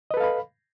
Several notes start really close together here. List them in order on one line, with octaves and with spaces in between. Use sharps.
D#5 B4 A4 F5 B5